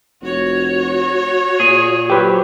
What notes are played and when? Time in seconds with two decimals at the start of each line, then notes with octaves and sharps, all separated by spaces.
0.22 F1 F#4 C#5
1.60 A#2 G#4
2.10 F#3 G4 B4 C5